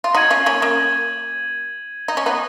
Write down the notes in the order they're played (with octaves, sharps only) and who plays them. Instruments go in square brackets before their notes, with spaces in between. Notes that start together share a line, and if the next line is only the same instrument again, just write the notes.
[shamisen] F4
[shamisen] D#4 F#4 [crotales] G#6 D#7 F#7
[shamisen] C#4 F4
A#3 C#4
A#3 C#4
D#4
C#4
B3 D#4